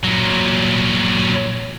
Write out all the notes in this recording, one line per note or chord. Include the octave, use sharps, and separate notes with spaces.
A#2 F#3